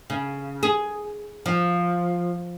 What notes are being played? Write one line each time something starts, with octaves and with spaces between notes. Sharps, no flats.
C#3
G#4
F3